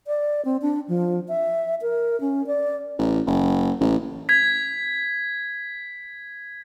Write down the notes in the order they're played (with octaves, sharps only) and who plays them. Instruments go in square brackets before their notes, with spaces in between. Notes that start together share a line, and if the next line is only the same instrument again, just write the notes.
[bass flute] D5
C4
D4
F3
E5
A#4
C#4
D5
[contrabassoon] A1
F#1
A1
[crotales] G#6 B6